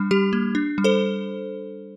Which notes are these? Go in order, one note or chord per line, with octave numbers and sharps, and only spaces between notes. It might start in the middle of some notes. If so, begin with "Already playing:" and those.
Already playing: G3 D4
G3 G4
A#3
D4
G3
A4 C5